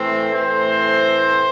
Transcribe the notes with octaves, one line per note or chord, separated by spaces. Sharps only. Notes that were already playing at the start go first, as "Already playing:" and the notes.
Already playing: A2 E3 A3 C4
A2 E3 A3 C4 C5